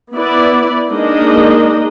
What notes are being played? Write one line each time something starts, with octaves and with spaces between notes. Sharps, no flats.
B3 E4 B4 D5
G#3 A#3 D4 D#4 A#4 D#5